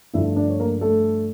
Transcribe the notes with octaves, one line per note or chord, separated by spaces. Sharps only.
G2 D3 F3 A3 E4 E5
D4 D5
C#5
A#3 A#4
A3 A4